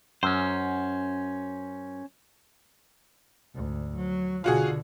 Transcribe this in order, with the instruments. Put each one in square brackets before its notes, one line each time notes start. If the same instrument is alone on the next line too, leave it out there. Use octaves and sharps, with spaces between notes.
[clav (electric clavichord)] F#2 [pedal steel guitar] C#4 C5
[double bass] D2 G#2
F#3
[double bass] B2 D3 [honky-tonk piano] F4 F#4 G#4